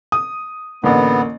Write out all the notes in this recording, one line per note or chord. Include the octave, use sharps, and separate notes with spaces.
D#6
A1 D3 A#3 B3